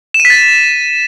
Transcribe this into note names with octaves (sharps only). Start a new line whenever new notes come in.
E7
D#7
B6
A6
B6